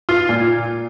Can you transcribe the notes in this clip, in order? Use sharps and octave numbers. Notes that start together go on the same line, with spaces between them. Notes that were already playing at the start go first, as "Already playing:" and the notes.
F4
A#2